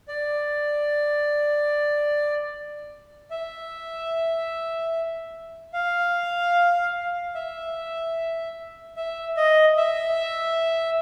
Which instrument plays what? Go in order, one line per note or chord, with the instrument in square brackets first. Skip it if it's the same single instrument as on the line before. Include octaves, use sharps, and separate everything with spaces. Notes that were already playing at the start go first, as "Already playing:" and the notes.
[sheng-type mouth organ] D5
E5
F5
E5
E5
D#5
E5